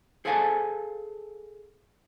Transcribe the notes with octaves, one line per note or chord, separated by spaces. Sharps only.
G#4 A4 C5 F5 G#5 A5